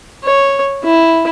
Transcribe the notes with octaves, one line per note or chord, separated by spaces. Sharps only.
C#5
E4